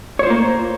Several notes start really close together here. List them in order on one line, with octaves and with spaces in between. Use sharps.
C#5 C5 F4 A#3